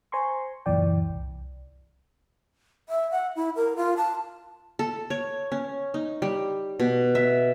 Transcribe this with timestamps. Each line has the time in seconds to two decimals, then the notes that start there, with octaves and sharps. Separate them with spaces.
0.12 C5 G#5 A#5 C6 C#6
0.66 C#2 F#2 A#2 E3 D5 G5
1.09 C2
2.89 E5
3.11 F#5
3.36 E4
3.56 A#4
3.77 F4
3.97 A5
4.79 A4
5.10 C#5
5.52 C#4
5.94 D#4
6.22 G3
6.80 B2
7.15 E5